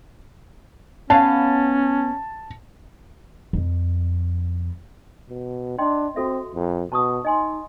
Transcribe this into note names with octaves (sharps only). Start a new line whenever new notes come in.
B3 C#4 C#5 F5 A5
F2
B2
D4 D#5 G5 C6
C4 F#4 A4 E5
F2
B2 A5 C#6 D#6
D#4 D#5 G#5 C6